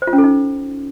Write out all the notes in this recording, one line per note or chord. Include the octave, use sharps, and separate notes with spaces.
C5
F4
C#4
A4
D#4